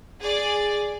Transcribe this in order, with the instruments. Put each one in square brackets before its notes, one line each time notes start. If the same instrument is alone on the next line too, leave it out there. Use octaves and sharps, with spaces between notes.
[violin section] G#4 D5